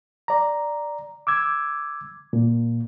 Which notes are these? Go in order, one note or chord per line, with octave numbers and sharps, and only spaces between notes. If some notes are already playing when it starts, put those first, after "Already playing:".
D5 A#5
D6 E6 G#6
A#2